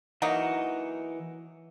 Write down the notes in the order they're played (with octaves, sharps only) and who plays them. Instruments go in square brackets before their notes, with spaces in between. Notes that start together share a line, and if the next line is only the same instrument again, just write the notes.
[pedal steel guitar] E3 F#5 [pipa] F#3 A#3 D#4